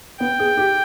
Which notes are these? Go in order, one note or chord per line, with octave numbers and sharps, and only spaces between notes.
B3 G5
G#4
G4